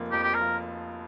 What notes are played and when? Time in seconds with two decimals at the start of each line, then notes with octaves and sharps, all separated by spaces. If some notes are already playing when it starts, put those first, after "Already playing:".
Already playing: F1 F3 A#3
0.12 F2 G4
0.24 G4
0.34 A#4
0.40 F3